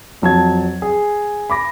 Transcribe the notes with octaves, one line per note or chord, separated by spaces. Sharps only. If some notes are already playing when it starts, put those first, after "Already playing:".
F2 F#3 A5 G#6
G#4
B5 D6 A#6